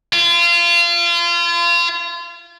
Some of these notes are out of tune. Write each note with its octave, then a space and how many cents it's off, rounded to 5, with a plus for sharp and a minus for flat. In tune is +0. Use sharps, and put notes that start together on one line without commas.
F4 -30